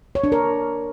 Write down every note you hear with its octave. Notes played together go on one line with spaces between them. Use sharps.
C#5
D4
A#4